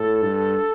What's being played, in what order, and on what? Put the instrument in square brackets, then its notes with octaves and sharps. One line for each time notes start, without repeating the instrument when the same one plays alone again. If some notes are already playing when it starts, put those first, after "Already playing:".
Already playing: [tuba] A2 [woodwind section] A4
[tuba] G2